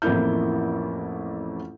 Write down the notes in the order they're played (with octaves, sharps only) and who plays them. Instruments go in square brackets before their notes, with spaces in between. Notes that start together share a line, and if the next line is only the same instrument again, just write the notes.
[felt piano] A1 F2 A#3 E4 G6